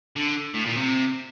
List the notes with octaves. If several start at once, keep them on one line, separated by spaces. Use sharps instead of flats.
D3
A2
A#2
C3